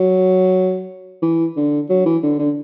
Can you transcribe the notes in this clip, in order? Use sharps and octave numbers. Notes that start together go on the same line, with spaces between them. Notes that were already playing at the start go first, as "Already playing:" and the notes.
Already playing: F#3
E3
D3
F#3
E3
D3
D3